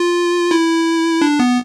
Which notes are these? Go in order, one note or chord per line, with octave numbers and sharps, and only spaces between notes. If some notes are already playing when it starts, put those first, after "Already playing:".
Already playing: F4
E4
D4
B3